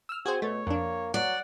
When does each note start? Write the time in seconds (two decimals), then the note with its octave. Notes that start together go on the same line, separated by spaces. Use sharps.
0.09 E6 F6
0.26 C4 F#4 G#4 C5 G#5
0.42 B2 A3 C#5
0.67 F2 A#3 D4
1.14 F#3 D5 F#5